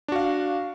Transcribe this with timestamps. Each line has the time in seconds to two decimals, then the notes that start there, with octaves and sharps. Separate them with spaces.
0.08 D4
0.12 F#4
0.16 F5